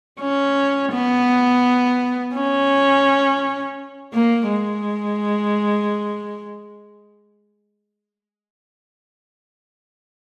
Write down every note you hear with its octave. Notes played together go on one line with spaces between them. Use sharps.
C#4
B3
C#4
A#3
G#3